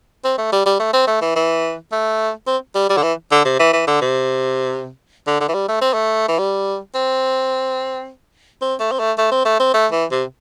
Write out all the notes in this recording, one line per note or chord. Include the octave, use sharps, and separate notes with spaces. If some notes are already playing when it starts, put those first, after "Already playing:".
C4
A3
G3
G3
A3
C4
A3
E3
E3
A3
C4
G3
G3
D3
E3
D3
C3
E3
E3
D3
C3
D3
D3
E3
G3
A3
C4
A3
E3
G3
C4
C4
A3
C4
A3
A3
C4
A3
C4
A3
E3
C3